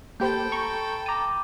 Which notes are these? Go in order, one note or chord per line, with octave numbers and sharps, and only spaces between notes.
A#3 G4 A4 C5 G5 B5 G6
A#5 C#6
A5 A#5 D6 D#7